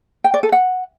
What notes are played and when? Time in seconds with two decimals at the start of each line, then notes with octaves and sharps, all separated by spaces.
0.24 G5
0.34 D5
0.43 A4
0.52 F#5